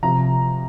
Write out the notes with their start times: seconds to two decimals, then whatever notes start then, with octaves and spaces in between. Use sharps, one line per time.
0.03 C3 F3 A#5